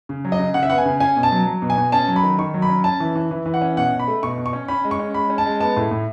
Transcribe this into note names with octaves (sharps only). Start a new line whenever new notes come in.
C#3
F#3
D#5
C#3
C#3 F#5
E5
B3 F#5
G#5
C#3
C#4 G#5
B2
A5
F#3
F#3
B2
G#5
B2
C#4 A5
F#3
B5
D#3
D#3 C#6
F#3
B5
C#4
C#4 A5
E3
E3
E3
E3
F#5
C#4
B2 F#5
B2
B5
A3
B2 C#6
B2
C#6
C#4
C#4 B5
G#3
C#6
C#4
G#3 B5
C#4
A5
G#3
B3 A5
A2
A2